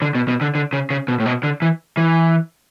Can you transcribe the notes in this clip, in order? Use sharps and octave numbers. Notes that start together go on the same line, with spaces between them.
D3
B2
B2
D3
D3
C#3
C#3
B2
A2
B2
D3
E3
E3